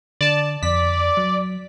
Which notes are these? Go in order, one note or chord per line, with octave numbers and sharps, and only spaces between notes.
D3 D5 A5
F2 D5 B6
F#3